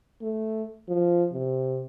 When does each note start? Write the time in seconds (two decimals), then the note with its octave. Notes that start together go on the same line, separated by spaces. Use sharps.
0.21 A3
0.88 F3
1.33 C3